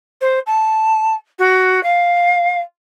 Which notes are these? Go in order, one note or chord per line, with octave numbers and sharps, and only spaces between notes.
C5
A5
F#4
F5